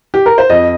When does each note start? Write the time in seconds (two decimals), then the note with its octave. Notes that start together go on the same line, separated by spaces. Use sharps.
0.14 G4
0.26 A#4
0.38 C5
0.49 F2 D#5